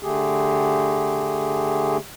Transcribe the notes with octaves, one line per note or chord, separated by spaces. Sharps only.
D3 A3 G4 G#4